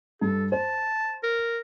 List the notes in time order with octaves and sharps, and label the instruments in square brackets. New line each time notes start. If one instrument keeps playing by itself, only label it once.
[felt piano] G2 [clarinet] A4
[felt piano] C5 [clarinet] A5
[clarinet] A#4